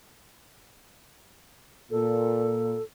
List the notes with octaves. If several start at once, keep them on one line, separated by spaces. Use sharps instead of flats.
A#2 A4